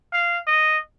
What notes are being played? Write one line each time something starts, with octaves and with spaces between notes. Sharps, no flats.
F5
D#5